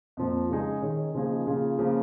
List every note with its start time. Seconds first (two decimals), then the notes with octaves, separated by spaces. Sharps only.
0.17 F2 F3 A#3
0.50 C#3 G#3 D#4 G#4
0.82 D#3 C#4 G#4
1.14 C#3 F3 A#3 D#4 G#4
1.47 C#3 A#3 F4 G#4
1.79 C#3 F3 A#3